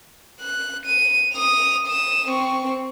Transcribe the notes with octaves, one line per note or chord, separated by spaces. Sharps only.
F#6
D#7
D#6 F7
D#6 E7
C4 C#6